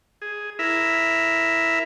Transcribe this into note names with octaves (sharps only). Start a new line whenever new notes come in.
G#4
E4 A#4 E5